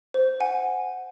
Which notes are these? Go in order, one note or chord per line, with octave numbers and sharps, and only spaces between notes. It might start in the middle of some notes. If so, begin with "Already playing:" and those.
C5
C5 F#5 G#5